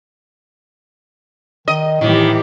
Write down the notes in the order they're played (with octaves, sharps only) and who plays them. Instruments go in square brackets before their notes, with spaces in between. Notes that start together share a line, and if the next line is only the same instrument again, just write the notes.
[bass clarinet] D#3 [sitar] D#5
[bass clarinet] A2 [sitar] D#3 [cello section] E3 G4